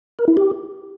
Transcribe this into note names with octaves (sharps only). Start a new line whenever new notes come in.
A#4
E4
G4